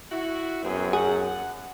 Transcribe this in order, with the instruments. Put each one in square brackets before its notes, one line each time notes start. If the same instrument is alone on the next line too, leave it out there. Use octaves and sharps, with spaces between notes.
[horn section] E4 F#4
[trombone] F#2 [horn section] B3 C4 G#4
[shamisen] G#4 [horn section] F#5